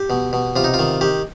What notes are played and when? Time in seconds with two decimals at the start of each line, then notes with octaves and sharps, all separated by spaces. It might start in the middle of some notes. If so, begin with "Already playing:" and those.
Already playing: G4
0.10 B2
0.33 B2
0.56 C3 F4
0.64 D#4
0.74 F4
0.79 D#3
1.01 D#3 G4